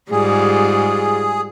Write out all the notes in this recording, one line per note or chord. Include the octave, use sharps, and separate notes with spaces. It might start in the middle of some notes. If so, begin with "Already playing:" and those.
G#2 G3 F4 G#4